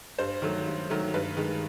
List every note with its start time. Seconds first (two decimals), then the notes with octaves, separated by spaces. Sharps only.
0.18 G2 C5
0.42 D#3 F#3 A3
0.67 G2
0.90 D#3 F#3 A3
1.14 G2 B4
1.37 D#3 G#3